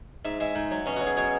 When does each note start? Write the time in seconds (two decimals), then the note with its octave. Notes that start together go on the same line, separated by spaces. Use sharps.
0.24 G#2 E5
0.40 G#3 E5
0.55 G#2
0.71 F#3
0.86 B2 C#4
0.96 F#3 F#4
1.06 G#4
1.17 B2 C#5